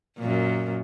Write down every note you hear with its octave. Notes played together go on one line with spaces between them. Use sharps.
F#2 A#2